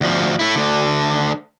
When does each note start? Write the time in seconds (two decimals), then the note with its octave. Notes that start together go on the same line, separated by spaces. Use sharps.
0.01 D2 F3
0.39 A3 E4
0.55 D2 D3